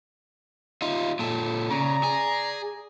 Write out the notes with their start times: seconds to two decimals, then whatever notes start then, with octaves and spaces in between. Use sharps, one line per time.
0.82 D#4 F4
1.19 A#2 A4
1.71 C#3 D5 A#5
2.03 G#4